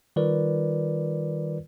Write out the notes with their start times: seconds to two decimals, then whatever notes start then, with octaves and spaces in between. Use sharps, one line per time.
0.16 D#3 G3 F4 A#4 B4 D5